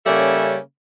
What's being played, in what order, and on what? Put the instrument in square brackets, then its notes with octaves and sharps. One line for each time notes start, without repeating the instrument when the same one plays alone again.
[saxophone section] C#3 G3 A#3 C#4 A4 E5